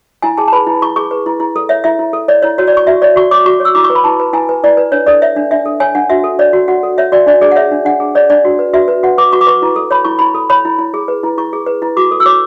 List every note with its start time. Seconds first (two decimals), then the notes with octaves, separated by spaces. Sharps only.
0.22 E4 G#5
0.38 G#4 A5
0.48 A5
0.52 B4 B5
0.67 E4
0.82 E4 C#6
0.96 G#4 C#6
1.11 B4
1.26 E4
1.40 E4
1.56 A4
1.69 C#5 E5
1.84 E4 E5
1.99 E4
2.13 A4
2.28 C#5 D5
2.42 E4 C#5
2.58 F#4 C#5
2.67 D5
2.72 C#5 C#6
2.86 F#4 E5
3.02 C#5 D5
3.16 F#4 C#6
3.31 C#5 D6
3.46 F#4 C#6
3.60 C#5
3.65 E6
3.75 E4 D6
3.84 C#6
3.90 B4
3.95 B5
4.04 E4 A5
4.20 B4
4.33 E4 G#5
4.49 B4
4.64 E4 D5
4.77 B4
4.92 D4 C#5
5.06 A4 D5
5.22 C#5 E5
5.36 D4
5.51 D4 E5
5.66 A4
5.80 C#5 G#5
5.95 D4 F#5
6.10 F#4 E5
6.24 A4
6.39 C#5 D5
6.53 F#4
6.68 F#4 F#5
6.83 A4
6.98 C#5 E5
7.12 F#4 D5
7.26 D4 D5
7.41 G#4 D5
7.52 F#5
7.56 C#5 E5
7.72 D4
7.85 D4 F#5
8.00 G#4
8.15 C#5 D5
8.30 D4 D5
8.45 F#4
8.59 B4
8.74 F#4 E5
8.88 B4
9.03 F#4 F#5
9.18 B4 D6
9.32 F#4 C#6
9.41 D6
9.47 B4 C#6
9.62 E4
9.76 A4
9.91 C#5 B5
10.04 E4 C#6
10.19 E4 B5
10.34 A4
10.50 C#5 B5
10.65 E4
10.79 E4
10.94 G#4
11.08 B4
11.23 E4
11.38 E4 C#6
11.53 G#4
11.66 B4
11.82 E4
11.97 F#4 D6
12.11 A4
12.20 E6
12.26 C#5 D6